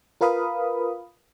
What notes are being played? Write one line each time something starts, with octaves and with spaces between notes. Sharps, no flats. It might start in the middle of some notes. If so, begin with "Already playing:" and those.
F4 A#4 B4 F5 B5 D#6